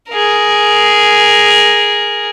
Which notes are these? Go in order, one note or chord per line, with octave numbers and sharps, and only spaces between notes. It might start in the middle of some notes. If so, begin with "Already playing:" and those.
G#4 A#4